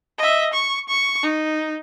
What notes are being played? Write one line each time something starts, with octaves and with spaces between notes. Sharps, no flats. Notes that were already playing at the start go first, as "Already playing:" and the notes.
D#5 E5
C#6
C#6
D#4